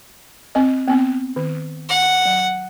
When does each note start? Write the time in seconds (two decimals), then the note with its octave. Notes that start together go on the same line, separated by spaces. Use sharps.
0.55 C4 D#5
0.88 B3 C4
1.36 D#3
1.89 F#5
2.25 F#3